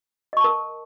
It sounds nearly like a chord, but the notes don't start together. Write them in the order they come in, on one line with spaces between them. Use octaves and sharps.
D#5 C#6 A5 A#4